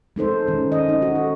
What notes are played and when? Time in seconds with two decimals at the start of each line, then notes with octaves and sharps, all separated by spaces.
0.16 G#3 D#4 A4 C5
0.47 D#3 C#4
0.72 D#5
0.89 D#4
1.02 F#4
1.15 A4